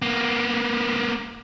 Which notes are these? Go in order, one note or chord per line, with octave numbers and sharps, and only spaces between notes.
A#3 B3